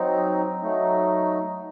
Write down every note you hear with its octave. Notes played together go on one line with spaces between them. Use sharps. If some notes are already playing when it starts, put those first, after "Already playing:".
Already playing: F#3 C4 D#4
F#3 A3 D#4